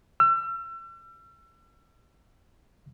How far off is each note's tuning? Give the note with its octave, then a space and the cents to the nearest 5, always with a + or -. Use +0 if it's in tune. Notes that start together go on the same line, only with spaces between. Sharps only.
E6 +40